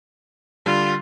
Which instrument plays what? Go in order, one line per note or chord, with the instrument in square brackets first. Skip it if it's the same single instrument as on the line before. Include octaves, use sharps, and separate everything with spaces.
[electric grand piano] D3 G3 [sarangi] F4